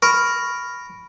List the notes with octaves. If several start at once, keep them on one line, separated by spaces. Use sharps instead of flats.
A#4 B5 C#6